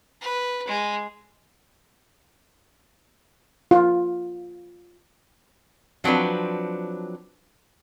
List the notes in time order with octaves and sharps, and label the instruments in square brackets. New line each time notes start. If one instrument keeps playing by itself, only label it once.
[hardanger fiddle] B4
G#3
[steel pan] F4
[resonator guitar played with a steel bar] F3 F#3 C4 D4 B4